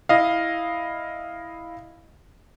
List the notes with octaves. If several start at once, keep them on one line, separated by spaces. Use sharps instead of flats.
E4 D#5 F5